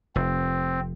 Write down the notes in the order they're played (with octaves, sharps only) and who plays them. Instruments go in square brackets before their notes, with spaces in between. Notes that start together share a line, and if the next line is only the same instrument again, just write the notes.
[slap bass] F1 [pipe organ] C4